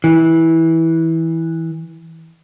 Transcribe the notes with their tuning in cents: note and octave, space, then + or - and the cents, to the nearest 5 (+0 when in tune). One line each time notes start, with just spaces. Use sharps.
E3 -15